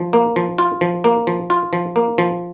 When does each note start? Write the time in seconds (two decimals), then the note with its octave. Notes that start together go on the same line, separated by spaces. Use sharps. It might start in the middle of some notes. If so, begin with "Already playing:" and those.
Already playing: F3
0.13 A#3
0.36 F3
0.58 F4
0.81 F3
1.04 A#3
1.27 F3
1.50 F4
1.73 F3
1.96 A#3
2.18 F3